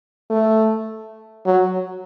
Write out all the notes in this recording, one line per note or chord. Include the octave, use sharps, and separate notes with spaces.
A3
F#3